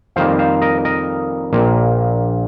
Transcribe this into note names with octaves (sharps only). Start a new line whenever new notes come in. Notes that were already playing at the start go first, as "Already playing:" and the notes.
F2 D#3 G3 A#3 C5 F5
C5 F5
A#4 D#5
A#4 D#5
A#1 A#2 A#3